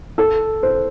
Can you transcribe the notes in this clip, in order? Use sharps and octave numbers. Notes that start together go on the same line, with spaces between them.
A4
C5